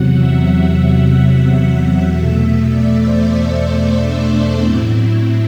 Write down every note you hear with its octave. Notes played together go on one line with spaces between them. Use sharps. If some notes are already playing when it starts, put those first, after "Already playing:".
Already playing: E2 C3 F#3 F#5
E5
E2 B2 A3 E5
D5
C5
A4
D4
A2 F#3 C4 E4